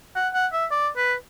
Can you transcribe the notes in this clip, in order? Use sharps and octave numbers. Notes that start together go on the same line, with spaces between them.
F#5
F#5
E5
D5
B4